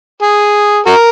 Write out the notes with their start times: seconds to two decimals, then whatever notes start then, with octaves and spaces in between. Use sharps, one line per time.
0.23 G#4
0.86 F#4 A#4